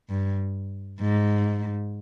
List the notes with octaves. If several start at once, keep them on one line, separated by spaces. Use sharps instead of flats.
G2
G#2